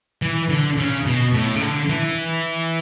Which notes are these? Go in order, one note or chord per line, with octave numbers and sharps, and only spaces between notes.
E3
D3
C#3
B2
A2
C#3
D3
E3